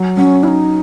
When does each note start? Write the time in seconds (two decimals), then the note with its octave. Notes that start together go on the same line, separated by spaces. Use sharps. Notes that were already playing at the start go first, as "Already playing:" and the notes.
Already playing: F#3
0.17 F#3 C#4
0.43 C#4 E4
0.48 D#4